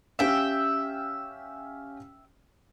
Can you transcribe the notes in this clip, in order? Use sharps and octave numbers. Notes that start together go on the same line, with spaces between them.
C#4 G4 E5 F5 G5